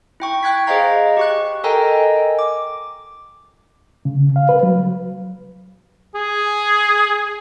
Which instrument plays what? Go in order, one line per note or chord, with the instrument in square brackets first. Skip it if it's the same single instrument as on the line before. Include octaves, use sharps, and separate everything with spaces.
[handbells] E4 G5 C#6
G5 F#6 G#6 B6
G#4 C5 D#5 F5 A#5
G4 C#6 F#6
A4 A#4 D#5 G5 G#5 A#5
D6
[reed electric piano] C#3
F5
B4
F#3
[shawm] G#4